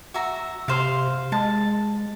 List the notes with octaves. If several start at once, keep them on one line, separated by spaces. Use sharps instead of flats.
F#4 E5 A#5
C3 C5 F5
G#3 A5